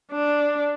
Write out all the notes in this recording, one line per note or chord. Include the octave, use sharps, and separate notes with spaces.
D4